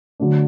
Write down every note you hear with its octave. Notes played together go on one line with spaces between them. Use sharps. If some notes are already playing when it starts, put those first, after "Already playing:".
D3 F#3 A3 D4